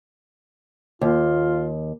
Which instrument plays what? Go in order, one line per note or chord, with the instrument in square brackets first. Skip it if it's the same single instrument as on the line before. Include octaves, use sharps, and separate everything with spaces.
[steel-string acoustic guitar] D#2 [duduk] F4